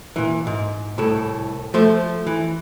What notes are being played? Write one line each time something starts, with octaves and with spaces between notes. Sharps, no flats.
A#2 E3
G#2
C2 A2 A4
F3 A3 C5
E3